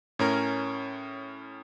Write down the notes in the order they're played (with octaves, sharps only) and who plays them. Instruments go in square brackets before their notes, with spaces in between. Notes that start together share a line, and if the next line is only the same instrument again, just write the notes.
[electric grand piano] A2 C#4 A#4